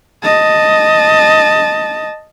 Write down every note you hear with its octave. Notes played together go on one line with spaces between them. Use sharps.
D#5 A5